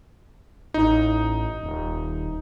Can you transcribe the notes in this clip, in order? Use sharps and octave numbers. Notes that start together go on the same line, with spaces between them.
A1 D#4
D#1